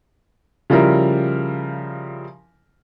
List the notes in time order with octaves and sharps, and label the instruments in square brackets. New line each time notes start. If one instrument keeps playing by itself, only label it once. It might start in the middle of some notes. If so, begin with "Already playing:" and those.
[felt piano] C#3 F3 G3 E4 A#4